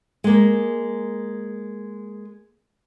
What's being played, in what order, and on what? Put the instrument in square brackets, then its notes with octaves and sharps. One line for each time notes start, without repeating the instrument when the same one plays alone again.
[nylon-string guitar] G#3 A#3